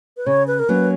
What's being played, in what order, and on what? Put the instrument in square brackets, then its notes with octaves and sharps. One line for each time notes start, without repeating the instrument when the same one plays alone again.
[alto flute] B4
[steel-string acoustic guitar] C#3 [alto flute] C#5
[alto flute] B4
A#4
[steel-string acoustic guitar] F#3 A#3 C#4 [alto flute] B4